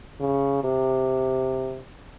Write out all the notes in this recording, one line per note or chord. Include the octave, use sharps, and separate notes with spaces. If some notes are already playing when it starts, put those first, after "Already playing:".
C#3
C3